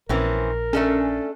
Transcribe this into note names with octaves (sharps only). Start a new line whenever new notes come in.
A#1 E3 C4 C#4 A#4
A3 C#4 D4 A4